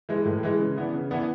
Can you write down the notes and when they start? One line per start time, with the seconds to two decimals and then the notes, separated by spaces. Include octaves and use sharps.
0.09 E3 G#3
0.25 A2
0.43 E3 G#3
0.59 C#3
0.76 E3 B3 D4
0.93 C#3
1.10 E3 B3 D4